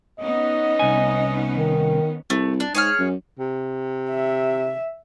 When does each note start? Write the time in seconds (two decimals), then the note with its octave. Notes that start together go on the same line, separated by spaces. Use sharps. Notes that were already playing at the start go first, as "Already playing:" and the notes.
0.20 B3 C#4 D#4 D#5
0.79 C2 G#5
1.54 D#3
2.30 C2 A3
2.60 D4
2.75 G#2 G#4 C#5 F6
2.99 F#2
3.39 C3
4.10 E5